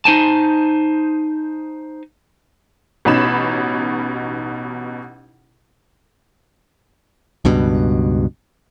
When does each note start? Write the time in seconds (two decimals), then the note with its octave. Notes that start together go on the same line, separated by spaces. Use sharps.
0.05 D#4 C5 G#5 A5
3.05 A1 B2 C#4 D#4 B5 E7
7.45 C#2 G2 B2